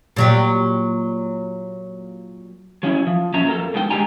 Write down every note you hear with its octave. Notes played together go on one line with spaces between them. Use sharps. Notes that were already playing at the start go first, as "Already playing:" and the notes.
A#2 F#3 G4
F#3 C#4 E4
F3
A#2 F#3 C#4 E5 A#5
F2 A4 A#4
B2 G#3 D#4 G5
D3 G#3 G4 G#4 G#5 A#5